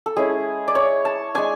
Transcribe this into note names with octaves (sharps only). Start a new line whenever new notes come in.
A4
G#3 C#4 E4 G#4
D5
C#5
A5
G#3 D4 G#5